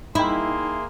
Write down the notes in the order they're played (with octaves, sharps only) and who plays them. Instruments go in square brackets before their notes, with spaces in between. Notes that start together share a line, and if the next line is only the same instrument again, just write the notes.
[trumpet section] A#3 G#4 C6 [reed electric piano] D#4 G5 [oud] E4